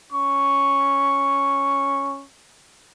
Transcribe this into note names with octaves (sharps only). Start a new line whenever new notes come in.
C#4 C#6